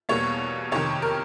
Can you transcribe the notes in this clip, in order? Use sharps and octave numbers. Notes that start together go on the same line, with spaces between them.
E2 B2 G3 A#3 C#5
F2 C3 D#3 C#5
A#4